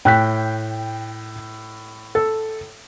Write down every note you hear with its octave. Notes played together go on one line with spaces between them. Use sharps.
A2 G5 F#6 B6
A4